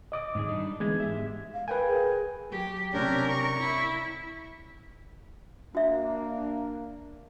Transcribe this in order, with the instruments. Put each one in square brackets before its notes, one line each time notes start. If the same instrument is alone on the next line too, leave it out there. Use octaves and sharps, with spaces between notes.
[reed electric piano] D#5 D6 D#6
[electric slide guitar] G#2 D#3 G#4
G3 D4 D#4
[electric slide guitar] D3 E3 B3 [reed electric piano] G#3 G#6
[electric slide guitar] G#2 G4 E5
[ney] F5
[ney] A#4 [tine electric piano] B4 G5 G#5
[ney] G#4
[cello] F#3 G4
[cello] C3 A#4 [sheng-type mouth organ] C#4 D4 G4
[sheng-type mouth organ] C#6
[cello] E4
[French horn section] A#3 [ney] D4 [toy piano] F#4 E5